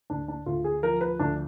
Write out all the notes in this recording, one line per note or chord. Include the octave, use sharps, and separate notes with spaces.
D2 D4
D4
D2 F4
G#4
F3 A#4
B4
D2 D4